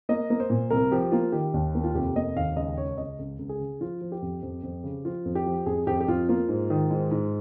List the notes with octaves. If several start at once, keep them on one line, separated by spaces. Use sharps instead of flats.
A#3 D#5
A#3
C5
A#2
C2 A#4
F3 G4
A#3 F4
D#3 G4
D#2
A#3
F4
F1 G4
A#3 D#5
D#2 F5
C#2 D#5
C#2 C#5
C#2 D#5
C#2
C#2
G#4
C#3
F3 F4
F3
G4
F2
F2
F2
C#3
F3 F4
F2
G4
F3
F2 G#4
F2 G4
G4
F2 F4
A#3 F4
G#2
D#3
G#2
G#2